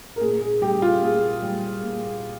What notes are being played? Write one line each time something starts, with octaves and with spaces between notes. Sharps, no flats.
A#4
A#2 G#4
G#4
G3 G4
F4
A#2 G#4
G3
A#2